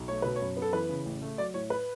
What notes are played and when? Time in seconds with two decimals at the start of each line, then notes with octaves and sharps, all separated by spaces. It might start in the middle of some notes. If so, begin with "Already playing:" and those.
Already playing: B1
0.08 A3 C#5
0.22 B2 B4
0.36 C#5
0.41 F#2
0.57 B3
0.62 A4
0.73 E3 B4
0.89 C#3
1.05 A1
1.22 A3
1.38 F#3 D5
1.54 A2 C#5
1.70 B4